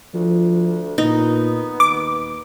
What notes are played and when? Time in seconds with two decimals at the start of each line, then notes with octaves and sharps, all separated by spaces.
0.14 D2 F3
0.98 A#2 B3 D#4
1.80 D#2 D6